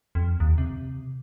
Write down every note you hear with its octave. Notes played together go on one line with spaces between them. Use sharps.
F2
D#2
C3